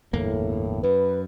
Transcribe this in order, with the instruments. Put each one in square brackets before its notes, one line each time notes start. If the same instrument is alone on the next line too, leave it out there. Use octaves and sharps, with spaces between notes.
[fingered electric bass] G1 E2 A#3 [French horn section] A2
[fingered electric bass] F#2 [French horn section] B4